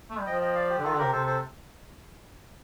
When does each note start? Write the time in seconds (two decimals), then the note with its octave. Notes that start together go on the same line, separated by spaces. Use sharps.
0.10 A3
0.18 G3
0.26 F3 D#5 G5
0.41 D#5 G5
0.55 D5 F5
0.70 G4
0.78 D3
0.84 D#3 F4 A4
0.94 D3
0.98 C3 G4 A#4
1.12 C3 A4 C5
1.26 A4 C5